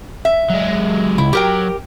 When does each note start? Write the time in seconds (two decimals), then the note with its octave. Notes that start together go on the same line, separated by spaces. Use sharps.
0.25 E5
0.50 F#3 G#3
1.18 C#2 E4
1.33 F#3 G4 A#4 G5